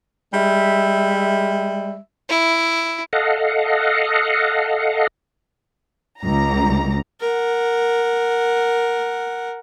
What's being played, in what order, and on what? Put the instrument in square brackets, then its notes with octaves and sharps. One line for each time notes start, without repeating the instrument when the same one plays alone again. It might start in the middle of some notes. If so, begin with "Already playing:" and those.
[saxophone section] G3 G#3 E5
[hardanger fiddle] E4
[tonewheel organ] A4 D#5 F5 F#5
[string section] C#2 A#5
[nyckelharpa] A#4 F#5